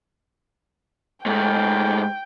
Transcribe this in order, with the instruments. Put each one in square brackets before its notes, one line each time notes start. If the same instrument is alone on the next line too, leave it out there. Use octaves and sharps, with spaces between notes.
[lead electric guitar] G#2 A3 [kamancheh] G5